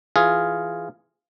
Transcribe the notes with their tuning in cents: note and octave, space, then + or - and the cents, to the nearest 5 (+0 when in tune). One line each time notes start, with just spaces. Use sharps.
E3 +10 F4 +0 G#4 +0